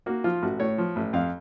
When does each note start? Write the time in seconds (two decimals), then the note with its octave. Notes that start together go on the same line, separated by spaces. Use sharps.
0.06 A#3 F#4
0.24 F3 F4
0.42 A1 F#4
0.59 A2 C#5
0.78 F3
0.96 A1
1.13 F2 F5